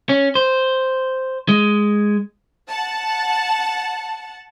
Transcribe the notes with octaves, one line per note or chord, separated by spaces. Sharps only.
C#4
C5
G#3
F#5 A5